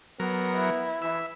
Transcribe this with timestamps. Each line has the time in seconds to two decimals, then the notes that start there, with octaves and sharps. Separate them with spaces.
0.20 F#3 B3 A#4
0.56 E4
1.02 E3 E5